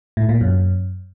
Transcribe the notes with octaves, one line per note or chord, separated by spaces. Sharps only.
A2
A#2
F#2